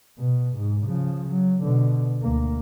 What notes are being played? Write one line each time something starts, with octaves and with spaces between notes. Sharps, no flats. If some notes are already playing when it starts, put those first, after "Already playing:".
B2
G#2
C#3 F3
F#3
B2 D3
D2 A#3